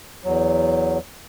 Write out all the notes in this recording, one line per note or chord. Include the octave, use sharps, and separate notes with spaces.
E2 F#3